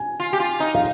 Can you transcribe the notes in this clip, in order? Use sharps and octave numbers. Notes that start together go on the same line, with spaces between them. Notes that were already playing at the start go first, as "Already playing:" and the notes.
Already playing: G#5
F4
G4
F4
D#4
F5